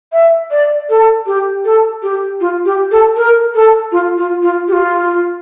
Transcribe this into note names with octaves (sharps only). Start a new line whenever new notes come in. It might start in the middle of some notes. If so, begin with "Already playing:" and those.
E5
D5
A4
G4
A4
G4
F4
G4
A4
A#4
A4
F4
F4
F4
G4
F4